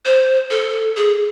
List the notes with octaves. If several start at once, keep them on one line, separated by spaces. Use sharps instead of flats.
C5
A4
G#4